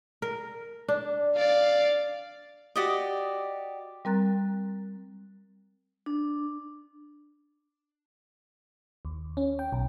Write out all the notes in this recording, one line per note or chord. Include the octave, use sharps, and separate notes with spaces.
A#4
D4
D5 F5
F#4 G4 D5 D#5
G3 C4 A#4 A#5 F#6 A6
D4
D#2
C#4
G5
B1